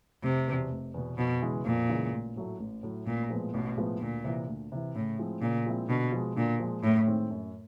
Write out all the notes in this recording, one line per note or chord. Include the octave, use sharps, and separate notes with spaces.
F1 C3
E2 B2
F1
E2 B2
F2 B2
C#3 E3 G#3
F2 A#2
C#3 E3 G#3
A1
A2 F#3 A3
A1
A2 F#3 A3
A1 A#2
A2 F3 G#3 B3
A1 B2
A2 F3 G#3 B3
D2 A#2
C3 E3
D2
C3 E3
A2 C#3
F3 G#3 C4 E4
A#2 C#3
F3 G#3 C4 E4
B2 D3
F3 G#3
A#2 D3
F3 G#3
F#2 A2
D#3 G#3 C4
F#2